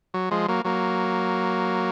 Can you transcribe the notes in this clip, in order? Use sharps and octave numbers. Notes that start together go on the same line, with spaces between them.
F#3
F3 G#3
F#3 A#3
F#3 A#3